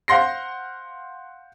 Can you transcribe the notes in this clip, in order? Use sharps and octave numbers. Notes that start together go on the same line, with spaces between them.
C5 F5 F#5 C6 A#6 C7